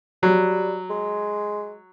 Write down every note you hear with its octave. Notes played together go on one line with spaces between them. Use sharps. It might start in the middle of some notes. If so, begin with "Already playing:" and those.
F#3 G3
G#3